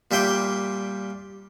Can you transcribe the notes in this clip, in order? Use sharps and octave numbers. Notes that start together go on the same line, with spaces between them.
A#2 G3 E5 G5 C6